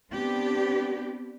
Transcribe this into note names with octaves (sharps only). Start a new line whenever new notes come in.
B3 C4 D4 G4